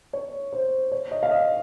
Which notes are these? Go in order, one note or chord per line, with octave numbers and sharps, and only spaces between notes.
C#5
C5
C#5
D#5
F5
D#5